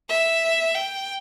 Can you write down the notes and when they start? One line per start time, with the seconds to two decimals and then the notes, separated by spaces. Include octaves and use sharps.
0.09 E5
0.75 G5